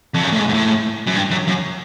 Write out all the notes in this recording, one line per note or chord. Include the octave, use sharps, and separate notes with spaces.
F2
F#2
A2
G#2
G#2
A2
F#2
G2
F#2
F#2